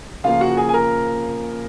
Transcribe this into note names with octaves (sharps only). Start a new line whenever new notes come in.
C#3 F3 A#3 F4 F5
F#4 F#5
G#4 G#5
G#5
A#4 A#5